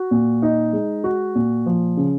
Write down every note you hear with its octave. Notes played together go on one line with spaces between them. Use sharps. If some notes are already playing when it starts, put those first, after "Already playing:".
Already playing: F#4
A#2
D#4
G#3
F#4
A#2
F3
C#3